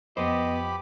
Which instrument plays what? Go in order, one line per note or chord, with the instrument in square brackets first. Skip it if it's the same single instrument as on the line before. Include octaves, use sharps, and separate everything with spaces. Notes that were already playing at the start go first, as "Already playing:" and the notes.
[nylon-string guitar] F2 [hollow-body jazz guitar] B3 C5 [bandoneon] G4 B5 D6 [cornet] D#5